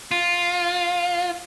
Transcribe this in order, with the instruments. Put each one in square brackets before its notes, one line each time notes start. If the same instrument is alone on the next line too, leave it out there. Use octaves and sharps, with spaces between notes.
[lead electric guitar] F4